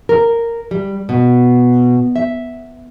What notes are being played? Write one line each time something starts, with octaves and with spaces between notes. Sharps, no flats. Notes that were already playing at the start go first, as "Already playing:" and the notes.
A#4
G3
B2
E5